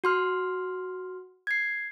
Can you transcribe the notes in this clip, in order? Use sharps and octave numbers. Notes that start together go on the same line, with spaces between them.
F#4 C6 F6
G#6 C7